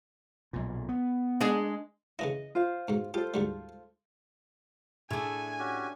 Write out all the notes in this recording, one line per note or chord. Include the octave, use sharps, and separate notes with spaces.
B1 A#2
B3
G#3 D4 G#4
C#3 E3 E4 D#5
F4 C5 F5
G#2 B2
F4 G4 A4 C5
D2 G#2 G3
A2 A3 D4 G#4 G#5 G#6
C#4 F#4 G4